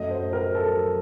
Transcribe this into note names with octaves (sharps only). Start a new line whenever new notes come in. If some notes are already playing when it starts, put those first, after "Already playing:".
Already playing: F#2 F#3 A3 D#5
C5
A#4
A4